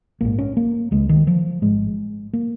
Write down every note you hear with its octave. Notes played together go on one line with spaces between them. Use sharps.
A#1 G#2 A#3
C#4
A#3
C#2 C#3 G#3
D#3
F3
G#1 G#2 G#3
A#3